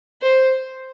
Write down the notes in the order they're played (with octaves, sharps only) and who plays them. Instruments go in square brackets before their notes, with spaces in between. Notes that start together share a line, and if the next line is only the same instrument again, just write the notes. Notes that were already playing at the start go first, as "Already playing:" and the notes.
[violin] C5